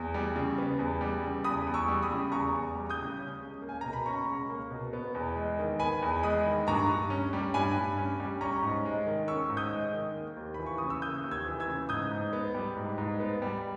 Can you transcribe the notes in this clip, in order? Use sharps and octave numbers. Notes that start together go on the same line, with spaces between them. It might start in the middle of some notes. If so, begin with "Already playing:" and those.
Already playing: E2
G3
C#3
B3
E2
G3
C#3
E2 B5 D#6
E2
C#6 E6
G3
B5 D#6
C#3
E2 A#5 C#6
E2
G3
D#6 G6
C#3
C#4
C#2
A#3
G#5
B2 A#5
B5
C#4 A#5 C#6
C#2
A#3
B2
B3
E2
G#3
D#3
B3 G#5 B5
E2
G#3 B5 D#6
D#3
G2 A#5 C#6
G2
C#4
G3
G2 G#5 B5
G2
C#4
G3
C#4 A#5 C#6
G#2
G#3
D#3
C#4 C#6 E6
G#2
D#6 G6
G#3
D#3
A#3
D#2
B5
E3
C#6
C#3 D#6
E6
A#3 D#6 G6
D#2
E6 G#6
E3
E6 G#6
C#3
G#2 D#6 G6
G#2
B3
G3
G#2
G#2
B3
G3